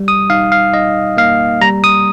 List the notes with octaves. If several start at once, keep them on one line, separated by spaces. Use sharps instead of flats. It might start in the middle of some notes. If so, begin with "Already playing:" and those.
Already playing: G3
D#6
D#4 F5
F5
D#4 D#5
A#3 F5
G3 A#5
D#6